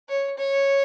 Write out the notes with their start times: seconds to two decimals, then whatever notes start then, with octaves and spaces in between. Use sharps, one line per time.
0.09 C#5
0.38 C#5